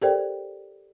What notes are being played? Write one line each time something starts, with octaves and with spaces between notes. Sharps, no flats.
G4 A4 A#4 C5 D5 G5